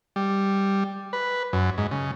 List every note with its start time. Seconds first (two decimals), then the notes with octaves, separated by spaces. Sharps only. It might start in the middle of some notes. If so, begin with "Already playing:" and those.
0.16 G3
1.13 B4
1.53 F#2
1.78 G#2
1.91 C#3